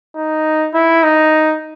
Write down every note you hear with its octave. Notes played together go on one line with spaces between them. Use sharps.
D#4
E4
D#4